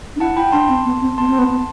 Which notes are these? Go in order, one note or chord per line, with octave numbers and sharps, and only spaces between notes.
D4
E4 F#5 A5
E4 G5 B5
D4 A5 C6
C4
B3
C4
B3 A5 C6
C4
B3
B3